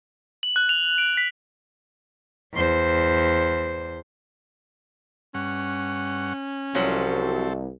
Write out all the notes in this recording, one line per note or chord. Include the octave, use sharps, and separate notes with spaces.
F#7
F#6
F7
F7
D7
B6
E2 C5
G2 C#4 F#5 C#6
C2 F3 F#3 C4 F#4 A4